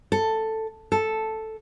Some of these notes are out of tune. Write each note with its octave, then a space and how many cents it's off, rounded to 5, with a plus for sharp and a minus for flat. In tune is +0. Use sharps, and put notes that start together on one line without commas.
A4 +5
A4 +0